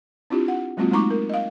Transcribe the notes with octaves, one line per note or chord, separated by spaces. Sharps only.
C4 D4 E4 F4 G4
F#5
F#3 G#3 A#3 C4 F4 F#4
G#3 A3 D#4 A#5 C#6 D6
A#4
D#5 F5